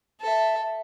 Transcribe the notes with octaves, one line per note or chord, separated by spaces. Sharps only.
A4 E5